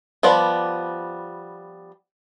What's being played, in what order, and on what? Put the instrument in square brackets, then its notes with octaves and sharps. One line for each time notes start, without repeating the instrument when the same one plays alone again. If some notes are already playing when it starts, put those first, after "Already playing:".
[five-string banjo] F3 G3 B3 D5